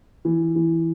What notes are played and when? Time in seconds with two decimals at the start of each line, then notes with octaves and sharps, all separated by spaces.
0.25 E3
0.56 E3